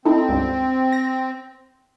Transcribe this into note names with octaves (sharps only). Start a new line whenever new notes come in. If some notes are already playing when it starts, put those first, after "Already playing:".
C4 D#4 E4 A4
C#2 G2 D3
A#6